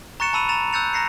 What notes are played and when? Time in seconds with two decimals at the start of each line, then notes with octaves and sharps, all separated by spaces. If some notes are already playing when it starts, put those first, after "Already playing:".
0.20 A#5 C#6 F#6 A6 C#7 E7
0.33 A5 B5 E6 D#7 F7
0.49 A#5 A6 E7 F7
0.73 E6 F#6 G6 A6 C#7 F7
0.93 A#5 A#6 C7 C#7